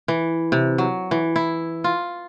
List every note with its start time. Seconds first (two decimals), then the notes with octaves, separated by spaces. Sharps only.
0.08 E3
0.52 C3
0.78 F#3
1.11 E3
1.36 E4
1.84 F4